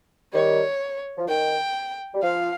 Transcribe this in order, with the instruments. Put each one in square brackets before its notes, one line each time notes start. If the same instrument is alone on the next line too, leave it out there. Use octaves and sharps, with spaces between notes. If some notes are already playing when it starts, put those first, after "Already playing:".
[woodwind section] D#3 G3 [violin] C#5
[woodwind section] F3
[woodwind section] D#3 [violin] G5
[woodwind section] G3
[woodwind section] F3 [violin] F5